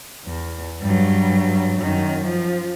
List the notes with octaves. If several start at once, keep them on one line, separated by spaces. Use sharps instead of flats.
E2
G2 F#3
F#2 D#3
F3